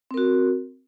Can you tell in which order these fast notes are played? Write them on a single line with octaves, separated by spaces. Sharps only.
C4 A#4 F#4